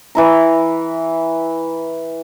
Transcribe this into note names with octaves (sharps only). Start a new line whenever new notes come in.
E3 E4 A#5